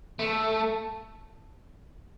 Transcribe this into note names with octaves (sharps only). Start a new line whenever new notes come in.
A3